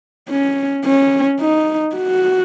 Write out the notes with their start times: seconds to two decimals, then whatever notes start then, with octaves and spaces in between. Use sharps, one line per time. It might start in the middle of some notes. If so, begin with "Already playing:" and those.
0.29 C#4
0.85 C#4
1.40 D#4
1.96 F#4